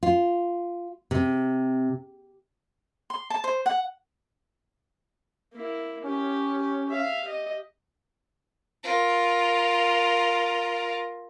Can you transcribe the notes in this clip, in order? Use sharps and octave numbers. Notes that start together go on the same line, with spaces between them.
F4
C3
C6
A5
C5
F#5
A#3 E4
C#4 G4
G4
E5 F5
G4 D#5
F4 A#4